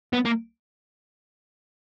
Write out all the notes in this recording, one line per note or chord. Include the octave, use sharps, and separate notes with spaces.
B3
A#3